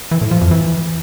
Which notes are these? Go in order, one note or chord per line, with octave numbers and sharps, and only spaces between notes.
E3
A2
F3
F2
E3